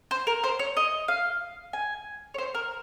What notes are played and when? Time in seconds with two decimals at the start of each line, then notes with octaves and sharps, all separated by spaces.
0.11 C5
0.27 A#4
0.43 C5
0.59 C#5
0.77 D#5
1.08 F5
1.73 G#5
2.34 C#5
2.38 C5
2.54 A#4